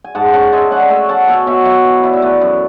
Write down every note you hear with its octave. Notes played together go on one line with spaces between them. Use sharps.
G#5
G#2 F#5 A5
C#4 F#5 A5
G#3 E5 G#5
C#4 D5 F#5
A3 E5 G#5
C#4 F#5 A5
B2 E5 G#5
B2 C#5 E5
E4 C#5 E5
E3
E4 D5
E5
A3 B4 D5
F#2